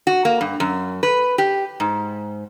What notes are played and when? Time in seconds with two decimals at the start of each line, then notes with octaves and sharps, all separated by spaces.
0.07 F#4
0.25 A#3
0.41 G2
0.60 F#2
1.03 B4
1.38 G4
1.80 G#2